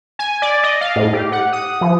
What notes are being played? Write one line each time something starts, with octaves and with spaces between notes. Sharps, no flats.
G#5
D5
D#5
F5
A2
G4
F#5
D#6
F3